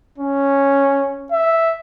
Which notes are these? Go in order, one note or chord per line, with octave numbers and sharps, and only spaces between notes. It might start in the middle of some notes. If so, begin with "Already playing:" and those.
C#4
E5